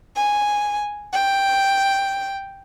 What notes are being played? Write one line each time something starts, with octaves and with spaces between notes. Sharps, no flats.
G#5
G5